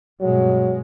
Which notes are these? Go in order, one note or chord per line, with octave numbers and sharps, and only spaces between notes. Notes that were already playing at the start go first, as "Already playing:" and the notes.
G2 B2 F#3 G#3